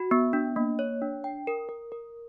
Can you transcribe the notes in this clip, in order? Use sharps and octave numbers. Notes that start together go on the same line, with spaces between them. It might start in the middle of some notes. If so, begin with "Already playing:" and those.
Already playing: F#4
B3
D4
A#3
C#5
D4
G5
A#4
A#4
A#4